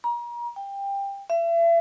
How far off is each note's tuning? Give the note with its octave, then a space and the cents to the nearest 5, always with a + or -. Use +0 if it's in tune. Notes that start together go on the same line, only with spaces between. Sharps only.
A#5 +35
G5 +20
E5 +35